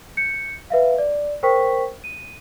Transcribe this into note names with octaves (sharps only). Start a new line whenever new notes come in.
G6 C#7
B4 E5 F5
D5
A#4 C5 G5 C#6 B6
D#7